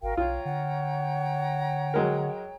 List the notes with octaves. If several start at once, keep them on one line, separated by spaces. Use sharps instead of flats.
G#1 F#4 A#4 F5 G5
B1 F4 C#5 G5 A#5
D3 F#5
F#3 G#3 A#4